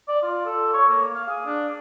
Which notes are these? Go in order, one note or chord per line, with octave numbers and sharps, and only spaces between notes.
D5
F4
A4
C#5
A#3
F5
G#4
D4